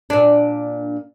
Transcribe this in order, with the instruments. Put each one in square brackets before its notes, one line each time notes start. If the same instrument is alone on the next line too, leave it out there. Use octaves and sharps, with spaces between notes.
[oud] A#2 D4